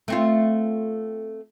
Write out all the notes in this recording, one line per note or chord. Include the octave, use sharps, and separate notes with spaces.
A3 C4 F4